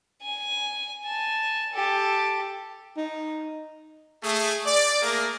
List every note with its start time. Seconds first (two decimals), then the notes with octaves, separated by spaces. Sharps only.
0.22 G#5
1.04 G#5 A5
1.73 G4 A4
2.97 D#4
4.24 A3 G#4
4.67 D5
5.02 A3 A#3 G#4 A#4